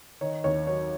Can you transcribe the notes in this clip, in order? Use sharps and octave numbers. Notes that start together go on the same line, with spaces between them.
D#3 C#5
D#2 C#5
F#3 C#5